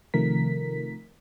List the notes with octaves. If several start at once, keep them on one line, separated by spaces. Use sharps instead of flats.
C3 D#3 F3 A3 A#4 B6